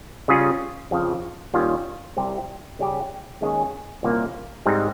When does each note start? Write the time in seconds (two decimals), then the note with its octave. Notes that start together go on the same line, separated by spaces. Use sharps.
0.28 C#3 G3 C#4 F4 G#4
0.91 F2 C#3 F3
1.54 D#2 D#3 G3 C#4 F4
2.16 C2 C3 G3 C4 G4
2.79 C#3 G3 C#4 G4
3.41 D#2 D#3 G#3 C#4 G#4
4.03 C2 A#2 F3 A#3 C#4
4.66 G#2 G3 C4 D#4